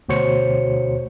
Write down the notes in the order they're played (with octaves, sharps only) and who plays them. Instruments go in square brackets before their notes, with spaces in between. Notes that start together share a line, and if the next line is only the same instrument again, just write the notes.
[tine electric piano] D2 B2 F#4 C5 C#5 C#7